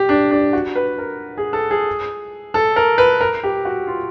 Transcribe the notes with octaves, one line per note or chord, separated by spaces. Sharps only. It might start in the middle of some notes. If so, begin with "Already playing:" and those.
Already playing: G4
D4
D4
F#4
B4
A#4
G#4
A4
G#4
A4
A#4
B4
A#4
G4
F#4
F4